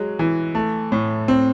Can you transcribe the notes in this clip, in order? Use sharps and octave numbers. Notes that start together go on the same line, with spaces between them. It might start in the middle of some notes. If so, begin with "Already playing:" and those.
Already playing: F#3 G#3
E3
A3
A2
C4